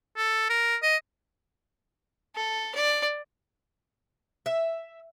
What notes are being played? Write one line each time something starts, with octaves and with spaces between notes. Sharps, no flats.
A4
A#4
D#5
A4
D5
E5